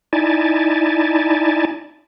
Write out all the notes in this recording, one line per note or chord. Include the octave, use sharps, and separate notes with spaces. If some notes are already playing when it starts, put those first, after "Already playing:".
D#4 E4 D5 G#5 A5